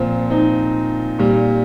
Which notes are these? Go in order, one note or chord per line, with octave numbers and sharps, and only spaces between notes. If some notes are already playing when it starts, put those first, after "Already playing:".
Already playing: A#2 F3 C4
C4 D#4
A#2 G3